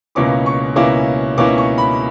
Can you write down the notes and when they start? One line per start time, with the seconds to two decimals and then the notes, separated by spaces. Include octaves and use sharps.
0.15 C#2 B2 A#3 C#4 E4 D6
0.46 C#6
0.76 C#2 B2 A#3 C#4 E4 D6
1.38 C#2 B2 A#3 C#4 E4 D6
1.58 C#6
1.78 B5